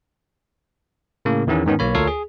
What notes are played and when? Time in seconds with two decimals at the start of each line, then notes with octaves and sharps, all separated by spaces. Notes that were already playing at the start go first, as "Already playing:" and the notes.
1.25 A2 C#3 A#3
1.47 E2 D#3 E3 B3 C#4
1.66 G#2 D#3 B3 C#4
1.79 B1 A#3 C#5 B5
1.95 D2 F4 A4 A#4 C#5 C7
2.07 G#4